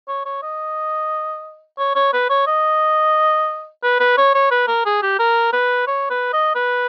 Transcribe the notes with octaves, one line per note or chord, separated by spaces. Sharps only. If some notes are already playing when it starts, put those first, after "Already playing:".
C#5
C#5
D#5
C#5
C#5
B4
C#5
D#5
B4
B4
C#5
C#5
B4
A#4
G#4
G4
A#4
B4
C#5
B4
D#5
B4